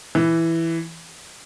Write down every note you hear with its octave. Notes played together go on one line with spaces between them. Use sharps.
E3